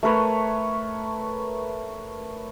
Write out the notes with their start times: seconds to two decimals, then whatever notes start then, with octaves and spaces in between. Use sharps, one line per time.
0.03 A3 A#4 B4 C#5